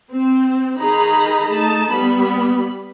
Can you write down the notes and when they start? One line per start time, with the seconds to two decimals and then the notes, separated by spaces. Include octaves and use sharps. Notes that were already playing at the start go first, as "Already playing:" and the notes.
0.13 C4
0.78 D#3 D#4 G#4 A#5 B5
1.53 A3 D#4 A5
1.91 G3 B3 B5